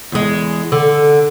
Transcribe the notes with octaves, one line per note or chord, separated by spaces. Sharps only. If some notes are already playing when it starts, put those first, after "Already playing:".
E2 G#3
D3